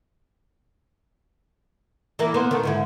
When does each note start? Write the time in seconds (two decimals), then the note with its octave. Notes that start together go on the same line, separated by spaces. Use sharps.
2.19 E3 A#3 E4
2.34 A#3 B3 C5
2.51 D#3 A3
2.63 G#2 D3 E4